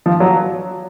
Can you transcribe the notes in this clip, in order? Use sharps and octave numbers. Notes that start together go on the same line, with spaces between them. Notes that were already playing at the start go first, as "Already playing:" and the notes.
F3
F#3